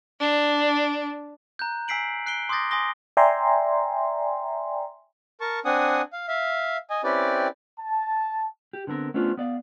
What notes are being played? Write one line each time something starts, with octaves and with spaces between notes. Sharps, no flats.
D4
A#5 F#6 G6
G#5 E6 B6 C7 D7 F#7
F#6 C7 D7 G7
C6 D6 D#6 G6 A6 A#6
G#5 C6 D#6 A#6 G7
D5 E5 G5 G#5 A#5 C6
A#4 A5 C#6
C4 D4 F#5 G#5 D#6
F5
E5 F5
D#5 G#5
C4 C#4 E4 G4 B4 D5
A5
G4
D3 B3 C4 A#4
A3 B3 C#4 D4 F4 C5
B3 D5 F5